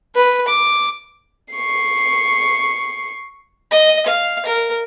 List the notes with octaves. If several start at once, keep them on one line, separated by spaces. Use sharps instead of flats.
B4
D6
C#6 C7
D#5
F5
A#4